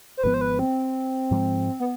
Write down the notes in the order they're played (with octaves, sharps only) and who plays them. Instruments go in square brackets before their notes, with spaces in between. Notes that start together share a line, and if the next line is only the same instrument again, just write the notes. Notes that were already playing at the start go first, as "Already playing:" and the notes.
[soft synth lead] C5
[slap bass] G#1 G#2 F3 B3 [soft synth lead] B4
[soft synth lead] C5
B4
C4
[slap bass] G#2 F3 G#3
[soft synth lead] B3